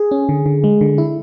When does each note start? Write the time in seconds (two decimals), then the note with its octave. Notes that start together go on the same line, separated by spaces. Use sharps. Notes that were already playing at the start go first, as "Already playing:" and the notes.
Already playing: G#4
0.11 C#4
0.29 D3
0.46 D3
0.64 G#3
0.81 D3
0.98 E4